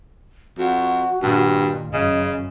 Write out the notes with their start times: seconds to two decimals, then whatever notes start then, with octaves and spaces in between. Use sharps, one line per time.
0.58 F2 F#4
1.22 G2 A#2 D#3
1.93 F#2 C#3 D#5